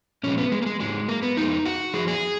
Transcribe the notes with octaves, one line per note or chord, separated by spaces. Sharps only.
A#2 F3 G#3 C#4
B3
G#3
A#3
G#3
G#2 F#3 G#3
A#3
B3
F2 F3 G#3 D#4
F#4
F#2 F3 G#4
G#4